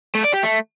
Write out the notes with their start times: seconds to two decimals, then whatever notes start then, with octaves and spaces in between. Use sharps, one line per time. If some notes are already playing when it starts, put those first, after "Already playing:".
0.15 A3
0.24 D5
0.34 G4
0.43 A3